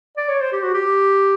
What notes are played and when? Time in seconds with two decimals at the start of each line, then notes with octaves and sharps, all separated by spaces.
0.17 D5
0.29 C#5
0.41 C5
0.52 G4
0.63 F#4
0.74 G4